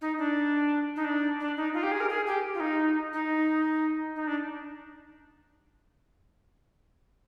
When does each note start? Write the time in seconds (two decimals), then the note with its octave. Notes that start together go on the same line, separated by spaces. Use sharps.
0.01 D#4
0.18 D4
0.96 D#4
1.04 D4
1.40 D4
1.56 D#4
1.74 F4
1.83 G4
1.91 G#4
2.00 A#4
2.09 G#4
2.26 G4
2.54 F4
2.60 D#4
3.13 D#4
4.16 D#4
4.27 D4